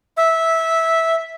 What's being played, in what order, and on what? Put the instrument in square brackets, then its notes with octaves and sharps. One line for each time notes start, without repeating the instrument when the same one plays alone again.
[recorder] E5